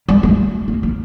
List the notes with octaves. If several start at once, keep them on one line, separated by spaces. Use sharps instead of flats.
G3
A3
A#3
A#3